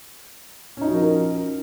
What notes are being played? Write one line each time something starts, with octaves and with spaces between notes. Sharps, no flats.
F3 C#4 D#4 F#4 A#4